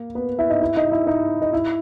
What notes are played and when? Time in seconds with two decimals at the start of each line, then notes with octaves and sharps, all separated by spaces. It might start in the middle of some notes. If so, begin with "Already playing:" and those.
Already playing: A#3
0.15 B3 B4
0.39 E4 E5
0.50 D#4 D#5
0.61 E4 E5
0.76 D#4 D#5
0.91 E4 E5
1.07 D#4 D#5
1.42 D#5
1.53 E4 E5